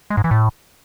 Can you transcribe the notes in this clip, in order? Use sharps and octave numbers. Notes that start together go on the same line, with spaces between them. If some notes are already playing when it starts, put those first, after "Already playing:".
G#3
G#2
E3
A2